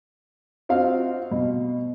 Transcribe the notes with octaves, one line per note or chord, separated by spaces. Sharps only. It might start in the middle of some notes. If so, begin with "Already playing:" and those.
C4 F4 F#4 D#5 F5
B2